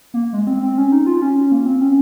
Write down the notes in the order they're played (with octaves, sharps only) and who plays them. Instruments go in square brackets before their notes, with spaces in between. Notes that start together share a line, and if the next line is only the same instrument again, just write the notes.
[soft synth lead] A#3
G#3
C4
C4
C#4
D#4
F4
C#4
A#3
C4
C#4